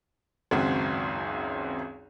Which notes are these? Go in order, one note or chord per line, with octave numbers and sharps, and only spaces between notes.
G#1 C#2 F#2 C4 F#4